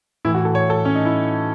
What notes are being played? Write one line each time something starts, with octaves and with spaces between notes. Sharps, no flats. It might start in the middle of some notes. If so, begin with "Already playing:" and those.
A2 E3 E4
F#4
A4
C#5
A4
C#4
D#4
E4